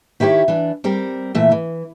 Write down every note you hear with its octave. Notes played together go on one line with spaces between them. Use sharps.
D#3 E4 G4 A#4 C#5
E3 D4
G3 C4 G4 A#4
A#2 E3 A3 E5
E3